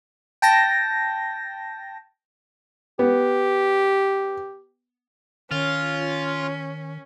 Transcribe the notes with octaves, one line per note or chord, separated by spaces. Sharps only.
G5 A5 A#6
B3 G4
D#3 C#4 F4